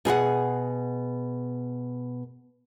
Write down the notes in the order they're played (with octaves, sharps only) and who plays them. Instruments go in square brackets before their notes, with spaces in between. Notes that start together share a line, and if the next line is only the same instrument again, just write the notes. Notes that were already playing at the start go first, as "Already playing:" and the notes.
[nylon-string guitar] B2 G#4 B4 F#5